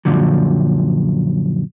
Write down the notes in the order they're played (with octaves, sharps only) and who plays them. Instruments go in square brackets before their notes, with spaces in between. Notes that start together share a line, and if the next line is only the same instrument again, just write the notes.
[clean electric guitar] F#2 A#2 D3 F3 F#3